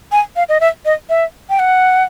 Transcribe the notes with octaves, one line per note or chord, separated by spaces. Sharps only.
G#5
F5
D#5
E5
D#5
E5
G5
F#5